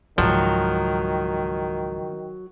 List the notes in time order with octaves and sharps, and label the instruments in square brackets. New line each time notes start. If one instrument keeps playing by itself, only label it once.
[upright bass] C#2 G#2 [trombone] D#3 [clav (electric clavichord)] F3 [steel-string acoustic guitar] F#3